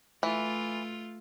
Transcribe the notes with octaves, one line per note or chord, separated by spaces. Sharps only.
E3 A3 F4